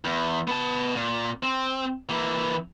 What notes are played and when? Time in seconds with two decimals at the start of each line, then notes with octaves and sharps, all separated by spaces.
0.05 E2
0.48 B3 A5
0.96 A#2
1.43 C4
2.09 E3 A#3